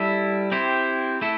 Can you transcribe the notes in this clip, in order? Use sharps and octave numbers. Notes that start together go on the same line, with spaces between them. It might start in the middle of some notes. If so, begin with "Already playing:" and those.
Already playing: G3 E4 A4
C4 E4 G4 C5
A3 E4 A4